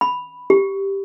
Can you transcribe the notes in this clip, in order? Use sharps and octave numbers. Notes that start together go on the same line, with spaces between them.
B5
G4